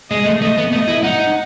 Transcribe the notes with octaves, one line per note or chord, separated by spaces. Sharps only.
G#3 D#5
A3
A3 D#5
B3
A3 D#5
E4
D#4 F#5